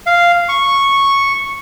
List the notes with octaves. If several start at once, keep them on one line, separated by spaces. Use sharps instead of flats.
F5
C#6